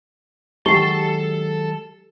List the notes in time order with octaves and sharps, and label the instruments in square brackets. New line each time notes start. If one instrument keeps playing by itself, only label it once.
[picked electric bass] D#3 F#3 G#3 [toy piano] G4 [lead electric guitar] A4 A5 [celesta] C7 G7